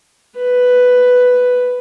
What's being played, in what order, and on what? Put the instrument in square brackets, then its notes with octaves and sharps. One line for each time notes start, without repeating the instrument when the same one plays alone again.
[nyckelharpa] B4